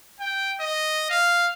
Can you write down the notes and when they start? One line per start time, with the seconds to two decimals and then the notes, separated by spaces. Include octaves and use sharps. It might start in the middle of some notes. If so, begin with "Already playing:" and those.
0.20 G5
0.60 D#5
1.10 F5